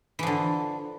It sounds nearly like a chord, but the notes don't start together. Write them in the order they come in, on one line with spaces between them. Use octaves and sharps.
E3 F3 D3